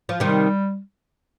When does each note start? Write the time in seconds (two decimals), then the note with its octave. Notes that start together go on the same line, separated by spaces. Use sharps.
0.09 F3
0.20 C3 D#3 G3